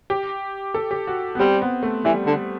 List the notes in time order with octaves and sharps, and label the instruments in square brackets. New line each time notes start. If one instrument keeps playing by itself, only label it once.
[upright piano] G4
A4
G4
F#4
B3
[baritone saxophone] G3 [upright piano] C4
[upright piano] B3
A3
[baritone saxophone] E3 [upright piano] G3
[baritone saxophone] D3